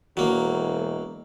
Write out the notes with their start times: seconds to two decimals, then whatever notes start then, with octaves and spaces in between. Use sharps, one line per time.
0.17 E1 F#3 A#3